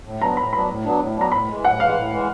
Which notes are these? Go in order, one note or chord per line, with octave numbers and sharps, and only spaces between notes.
A2
F#3 B3 D4 A#5
A2 B5
F#3 B3 D4 B5
A2
F#3 B3 D4
A2
F#3 B3 D4 A#5
A2 B5
E3 G#3
A2 F#5
E3 G#3 F5
A2
E3 G#3